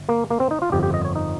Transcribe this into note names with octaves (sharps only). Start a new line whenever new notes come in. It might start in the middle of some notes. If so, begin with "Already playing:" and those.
Already playing: G1
A#3
A#3
C4
D#4
F4
G1 F2 D#3 G4
G4
D#5
C#5
D#4